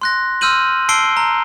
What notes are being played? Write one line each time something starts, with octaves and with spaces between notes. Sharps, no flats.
C6 F#6 A#6
C6 E6 F6 G6 D#7 F#7
A5 E6 C7 D7 G7
A#5